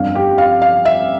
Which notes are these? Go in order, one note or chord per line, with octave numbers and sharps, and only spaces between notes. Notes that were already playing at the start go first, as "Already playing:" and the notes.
Already playing: G1 F2 D3 F5
G4
F5
F5
E5